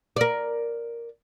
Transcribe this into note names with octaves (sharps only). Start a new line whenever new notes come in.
A#4 D5